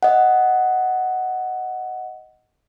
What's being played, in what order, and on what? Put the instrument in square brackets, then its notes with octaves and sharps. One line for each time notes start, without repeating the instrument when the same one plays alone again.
[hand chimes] D#5 F#5